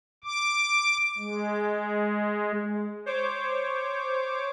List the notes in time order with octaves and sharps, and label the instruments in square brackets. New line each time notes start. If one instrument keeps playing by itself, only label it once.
[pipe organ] D6
G#3
[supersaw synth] C5 C#5 D6